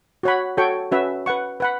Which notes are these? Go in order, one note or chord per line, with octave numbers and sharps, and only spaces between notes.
F#4 C#5 F#5 B5
F#4 A4 C#5 G5 C#6
C#4 F#4 B4 E5
B4 F#5 C#6
B4 F#5 B5